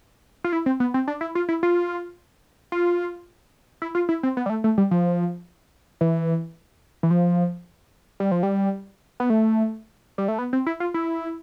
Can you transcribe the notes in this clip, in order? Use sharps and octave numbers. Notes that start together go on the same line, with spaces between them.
F4
E4
C4
B3
C4
D4
E4
F4
E4
F4
F4
E4
F4
E4
C4
B3
G3
A3
A3
G3
F3
E3
E3
F3
G3
F3
G3
B3
A3
G3
A3
B3
C4
E4
F4
E4